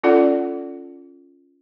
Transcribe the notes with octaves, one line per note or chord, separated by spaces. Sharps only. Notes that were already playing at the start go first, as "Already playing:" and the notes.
C#4 F4 A4 D5 F#5